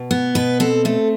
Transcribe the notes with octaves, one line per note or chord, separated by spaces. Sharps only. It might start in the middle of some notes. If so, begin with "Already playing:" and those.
Already playing: B2
B3
B2 B4
C4 A4
A3 A4